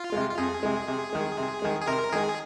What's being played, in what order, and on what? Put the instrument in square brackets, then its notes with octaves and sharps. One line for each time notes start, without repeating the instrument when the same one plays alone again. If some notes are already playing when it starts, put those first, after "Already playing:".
Already playing: [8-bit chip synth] F4
[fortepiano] C3 G#3
[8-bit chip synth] F4
[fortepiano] F2 [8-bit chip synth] G#4
[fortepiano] C3 G#3
C3
D#3 G#3
C3
D#3 G#3
[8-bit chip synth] G#4
[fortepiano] C3 [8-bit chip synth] A#4
[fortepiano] D#3 G#3 [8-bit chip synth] G#4